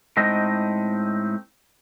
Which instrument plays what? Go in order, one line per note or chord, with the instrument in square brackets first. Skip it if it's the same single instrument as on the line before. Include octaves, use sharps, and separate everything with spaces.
[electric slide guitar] A2 G#3 C4 D#4 D#5